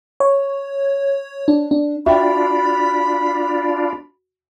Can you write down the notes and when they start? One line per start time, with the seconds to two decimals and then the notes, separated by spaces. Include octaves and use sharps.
0.20 C#5
1.48 D4
1.71 D4
2.06 D4 F4 F#4 E5 G5 B5